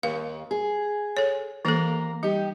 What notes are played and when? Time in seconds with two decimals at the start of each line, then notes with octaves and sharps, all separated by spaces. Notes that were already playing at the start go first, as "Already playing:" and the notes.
0.03 D#2 F5
0.51 G#4
1.17 A4 C#5
1.65 D#2 E3 A#3 A4 A#4
2.23 G3 D#4 G4